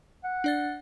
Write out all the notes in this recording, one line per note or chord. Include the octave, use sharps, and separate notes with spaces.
F#5
D4 D5 A6